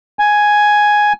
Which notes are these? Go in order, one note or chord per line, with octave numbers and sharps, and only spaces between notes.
G#5